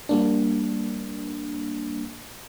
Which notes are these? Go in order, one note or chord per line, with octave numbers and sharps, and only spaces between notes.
G3 A#3 D4